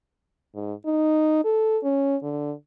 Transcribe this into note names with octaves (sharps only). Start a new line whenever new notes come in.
G#2
D#4
A4
C#4
D3